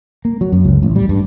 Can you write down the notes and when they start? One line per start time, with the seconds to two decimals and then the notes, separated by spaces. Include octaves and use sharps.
0.25 A#3
0.41 F#3
0.52 F#2
0.65 C#2
0.83 A1
0.96 G3
1.09 G2